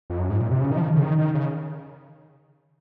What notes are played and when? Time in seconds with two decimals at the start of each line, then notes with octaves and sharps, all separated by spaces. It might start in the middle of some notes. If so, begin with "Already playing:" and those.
0.10 F2
0.19 F#2
0.30 G#2
0.40 A#2
0.51 C3
0.61 C#3
0.71 D#3
0.77 F3
0.81 D#3
0.94 C#3
1.03 D#3
1.18 D#3
1.34 C#3